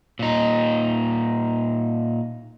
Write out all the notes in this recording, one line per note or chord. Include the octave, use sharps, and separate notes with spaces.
A#2 D#4